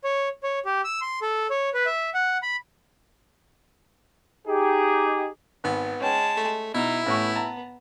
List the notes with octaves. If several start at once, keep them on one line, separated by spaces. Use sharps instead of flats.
C#5
C#5
G4
E6
C6
A4
C#5
B4
E5
F#5
B5
D#4 G4 G#4
G#1 B3
G#3 C#4 G5 A5
A3
B2 D#4 E4
A1 A2 B3 C#6
A5 A#5